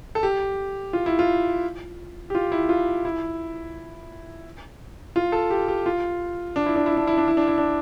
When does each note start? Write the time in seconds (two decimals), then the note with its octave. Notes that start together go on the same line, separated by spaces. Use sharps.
0.15 A4
0.23 G4
0.93 F4
1.06 E4
1.19 F4
2.30 G4
2.35 F4
2.52 E4
2.69 F4
3.05 E4
5.16 F4
5.32 A4
5.51 G4
5.68 G4
5.86 F4
6.56 D4
6.66 E4
6.76 D4
6.86 E4
6.97 D4
7.07 E4
7.18 D4
7.28 E4
7.37 D4
7.48 E4
7.58 D4